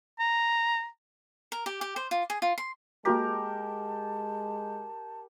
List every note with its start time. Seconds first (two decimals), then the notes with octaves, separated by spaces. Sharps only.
0.19 A#5
1.52 A#4
1.66 G4
1.81 G4
1.96 C5
2.11 F4
2.30 G#4
2.42 F4
2.58 C6
3.05 G#3 A#3 F#4 G4 A#4 A5 B6